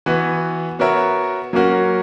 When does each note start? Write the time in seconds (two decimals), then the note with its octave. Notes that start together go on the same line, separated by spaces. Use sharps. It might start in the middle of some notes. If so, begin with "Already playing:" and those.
0.06 E3 B3 F#4 B4
0.79 B3 F#4 A#4 C#5 E5
1.53 F#3 A#3 C#4 F#4 A#4